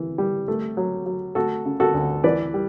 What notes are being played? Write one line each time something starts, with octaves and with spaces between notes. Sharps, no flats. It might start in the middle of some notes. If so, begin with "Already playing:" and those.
Already playing: E3
G3
A3
F#3
F#3
A3 F#4 A4
C#3
F#4 A4
D2
E3 B4 D5
G3